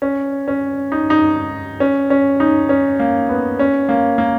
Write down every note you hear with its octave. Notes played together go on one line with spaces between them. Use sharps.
C#4
C#4
D#4
D#4
C#4
C#4
D#4
C#4
A#3
B3
C#4
A#3
A#3